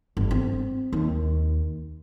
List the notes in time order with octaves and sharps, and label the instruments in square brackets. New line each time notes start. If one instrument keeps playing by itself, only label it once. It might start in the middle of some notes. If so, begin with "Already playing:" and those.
[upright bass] G1
C4
D#2